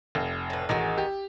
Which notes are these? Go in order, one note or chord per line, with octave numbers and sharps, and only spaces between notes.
F1
A2 B4
A1 D#3 G#3 F#4
G4